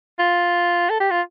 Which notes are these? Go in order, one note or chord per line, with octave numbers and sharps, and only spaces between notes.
F4
A4
G4
F4